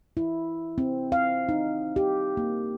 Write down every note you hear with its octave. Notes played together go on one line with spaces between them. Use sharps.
E4
C4
F5
D#4
G4
A#3